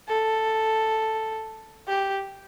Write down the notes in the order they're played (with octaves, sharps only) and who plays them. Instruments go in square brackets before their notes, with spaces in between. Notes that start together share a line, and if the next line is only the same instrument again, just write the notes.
[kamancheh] A4
G4